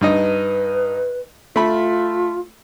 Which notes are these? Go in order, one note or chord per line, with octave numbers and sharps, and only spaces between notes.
G2 D#4 B4 D#5
A3 F4 B5